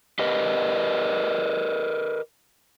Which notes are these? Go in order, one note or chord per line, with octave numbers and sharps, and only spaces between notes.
G4 A#4 B4 D#5